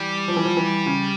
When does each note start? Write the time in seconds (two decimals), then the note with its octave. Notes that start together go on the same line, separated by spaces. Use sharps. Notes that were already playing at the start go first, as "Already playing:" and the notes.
Already playing: E3 G3
0.28 F3
0.37 E3
0.45 F3
0.57 E3
0.86 C#3